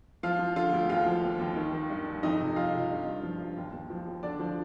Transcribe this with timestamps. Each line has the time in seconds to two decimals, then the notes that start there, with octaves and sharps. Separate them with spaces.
0.23 F3 F4 F5
0.39 F3
0.56 D3 F4 F5
0.73 D2
0.89 D#2 F4 F5
1.06 F3
1.23 D#2
1.40 D#2
1.56 D#3
1.73 D#3
1.90 G2
2.06 G2
2.23 F2 D#4 D#5
2.40 C3
2.56 F2 F4 F5
2.73 C3
2.90 G2
3.06 G2
3.23 F3
3.40 G2
3.56 D#2
3.73 D#2
3.90 F3
4.07 D#2
4.23 D3 D4 D5
4.40 F3